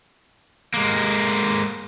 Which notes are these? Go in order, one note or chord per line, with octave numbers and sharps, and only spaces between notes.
G#3 A#3